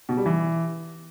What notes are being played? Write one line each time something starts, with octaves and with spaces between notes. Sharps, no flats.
B2
G3
E3